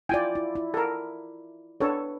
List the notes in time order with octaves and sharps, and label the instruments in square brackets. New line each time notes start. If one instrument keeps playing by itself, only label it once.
[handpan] E4 F4 D5 [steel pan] G5 G#5
[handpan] E4
E4
[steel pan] A4 A#4
[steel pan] D4 A4 C#5 [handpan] B4